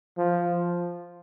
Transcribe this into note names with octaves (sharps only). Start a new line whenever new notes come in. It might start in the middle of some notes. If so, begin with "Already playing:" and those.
F3